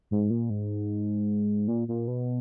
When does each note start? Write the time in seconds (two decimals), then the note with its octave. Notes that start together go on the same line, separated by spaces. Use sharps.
0.11 G#2
0.30 A#2
0.50 G#2
1.68 A#2
1.88 A#2
2.08 B2